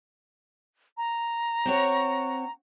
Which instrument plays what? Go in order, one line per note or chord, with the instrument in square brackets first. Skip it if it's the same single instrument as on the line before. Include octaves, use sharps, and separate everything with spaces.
[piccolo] A#5
[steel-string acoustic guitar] C4 F#4 C#5